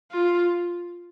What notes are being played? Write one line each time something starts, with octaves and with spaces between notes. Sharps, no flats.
F4